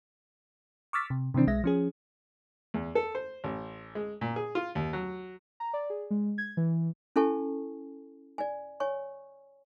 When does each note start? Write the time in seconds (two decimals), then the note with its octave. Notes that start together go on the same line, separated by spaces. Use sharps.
0.93 C#6 D6 E6 F6 A6 B6
1.10 C3
1.34 C3 D#3 E3 C4 D4
1.47 B1 G#3 E5 A#6
1.64 F3 C#4 G#4
2.74 E2
2.95 A4
3.15 C5
3.44 A1
3.95 G#3
4.21 A#2
4.36 G#4
4.55 F4
4.75 D#2
4.93 F#3
5.60 A#5
5.73 D5
5.90 G#4
6.11 G#3
6.38 G#6
6.57 E3
7.16 C#4 E4 A4 G#5 A5 C#6
8.38 D5 G#5
8.80 C#5 G#5 C#6